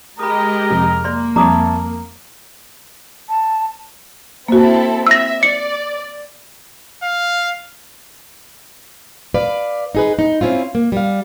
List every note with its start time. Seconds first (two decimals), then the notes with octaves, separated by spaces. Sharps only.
0.19 G#3 G4 A#4 D#5 A#5 B5 D#6
0.70 F2 C3
1.04 A#3 D5 C6
1.36 F2 G3 C#5 E5 A5 A#5 D6 D#6
3.29 A5
4.48 A#3 C4 E4 F#4 A4
5.07 E5 E6 A#6
5.43 D5 C#7
7.03 F5
9.34 B4 D5 F5
9.95 D#4 G#4 B4
10.19 D#4
10.41 C4 C#4 E4 F4
10.75 A#3
10.92 G3 F5